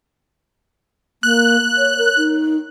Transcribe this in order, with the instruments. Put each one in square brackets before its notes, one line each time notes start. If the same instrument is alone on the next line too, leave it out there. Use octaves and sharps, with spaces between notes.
[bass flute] A#3 [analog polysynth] F#6
[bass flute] C#5
A#4
D#4